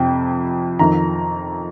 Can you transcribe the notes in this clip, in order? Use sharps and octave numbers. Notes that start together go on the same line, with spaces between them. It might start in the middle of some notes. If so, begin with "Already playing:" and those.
Already playing: F2 C3 G5
F2 D#3 A#5